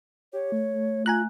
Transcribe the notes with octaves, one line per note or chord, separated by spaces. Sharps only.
G4 C#5
A3
A3
F4 G#5 A#5 F#6